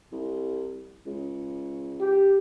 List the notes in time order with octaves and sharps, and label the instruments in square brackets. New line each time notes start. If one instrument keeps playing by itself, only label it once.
[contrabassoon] C2
C#2
[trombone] G4